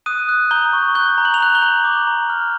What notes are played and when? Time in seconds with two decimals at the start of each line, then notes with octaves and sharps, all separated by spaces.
0.06 D#6 F#6 D#7
0.29 F#6
0.51 A#5 G6 G7
0.73 C#6
0.95 F#6 G6 G7
1.18 A#5
1.25 F#7
1.34 F7
1.40 A#5 F#6 F#7
1.55 G6 G7
1.62 A#5
1.84 D6
2.07 A#5
2.30 F6